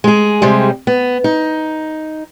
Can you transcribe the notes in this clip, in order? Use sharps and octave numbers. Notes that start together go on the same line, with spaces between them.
G#3 G#4
C3 G3 G#3
B3
D#4